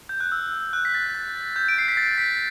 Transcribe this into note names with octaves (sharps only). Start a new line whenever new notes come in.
G6
F#6
E6
F#6
B6
A6
A6
G6
D7
C7
B6
A6
B6